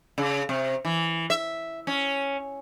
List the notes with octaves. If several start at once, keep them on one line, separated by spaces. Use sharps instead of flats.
C#3
C3
E3
E5
C#4